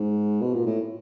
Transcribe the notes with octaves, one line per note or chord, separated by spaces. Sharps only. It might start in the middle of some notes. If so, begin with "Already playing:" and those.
Already playing: G#2
B2
A#2
A2